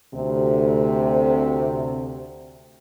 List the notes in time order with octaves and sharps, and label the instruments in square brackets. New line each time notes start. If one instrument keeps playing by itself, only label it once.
[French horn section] D2 C3